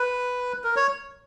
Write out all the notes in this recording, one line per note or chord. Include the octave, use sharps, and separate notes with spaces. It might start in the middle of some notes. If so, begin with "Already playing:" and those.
Already playing: B4
A#4
C#5